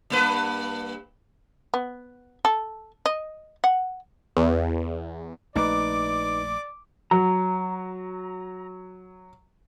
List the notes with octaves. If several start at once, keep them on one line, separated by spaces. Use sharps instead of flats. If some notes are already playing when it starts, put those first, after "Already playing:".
G2 A#3 B4
B3
A4
D#5
F#5
E2
A#1 A3 D#4 B4 D5 D6
F#3 A#5